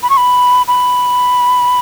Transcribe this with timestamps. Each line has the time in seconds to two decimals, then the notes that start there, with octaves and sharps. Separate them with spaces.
0.03 B5
0.10 C#6
0.17 B5
0.68 B5